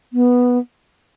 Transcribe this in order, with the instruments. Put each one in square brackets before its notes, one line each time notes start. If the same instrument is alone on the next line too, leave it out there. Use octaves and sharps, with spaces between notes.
[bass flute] B3